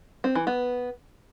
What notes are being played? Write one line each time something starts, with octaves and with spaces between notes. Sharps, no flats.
C4
E3
B3